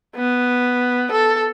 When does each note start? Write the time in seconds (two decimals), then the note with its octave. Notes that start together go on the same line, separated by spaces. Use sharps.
0.16 B3
1.12 A4